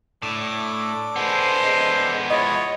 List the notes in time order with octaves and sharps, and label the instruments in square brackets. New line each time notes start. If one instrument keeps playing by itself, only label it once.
[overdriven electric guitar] A2 [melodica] D4 A4 D6
[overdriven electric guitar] G#3 B3 [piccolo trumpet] C5
[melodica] E4 F4 B4 [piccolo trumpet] C#5 [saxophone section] D#5